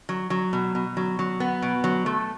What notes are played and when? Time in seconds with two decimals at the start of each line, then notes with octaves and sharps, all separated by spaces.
0.09 F#3
0.30 F#3
0.53 B2
0.75 B2
0.97 F#3
1.19 F#3
1.40 B3
1.62 B2
1.84 F#3
2.06 A3